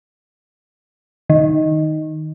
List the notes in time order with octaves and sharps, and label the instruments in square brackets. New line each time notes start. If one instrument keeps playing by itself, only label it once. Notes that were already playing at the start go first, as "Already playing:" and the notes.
[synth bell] D#3